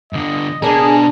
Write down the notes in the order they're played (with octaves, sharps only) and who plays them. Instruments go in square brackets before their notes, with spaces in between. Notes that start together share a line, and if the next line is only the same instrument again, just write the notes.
[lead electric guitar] G2 D3 [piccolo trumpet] D#5
[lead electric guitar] B2 A5 [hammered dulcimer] D4 A#4 [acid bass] G#4 [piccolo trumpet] A#5